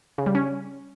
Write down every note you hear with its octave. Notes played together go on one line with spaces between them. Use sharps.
C#3
G3
C#4